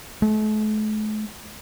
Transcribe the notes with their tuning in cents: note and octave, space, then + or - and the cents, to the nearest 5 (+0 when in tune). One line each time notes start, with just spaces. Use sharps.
A3 -45